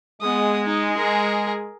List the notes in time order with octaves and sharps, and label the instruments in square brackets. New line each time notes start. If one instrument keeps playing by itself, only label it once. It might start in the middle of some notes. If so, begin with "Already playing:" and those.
[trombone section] G#3 [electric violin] B3 D#6
[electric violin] D#4
G#4 A#4